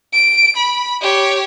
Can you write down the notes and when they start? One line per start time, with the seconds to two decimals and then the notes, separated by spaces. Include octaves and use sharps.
0.13 D7
0.56 B5
1.02 G4 C#5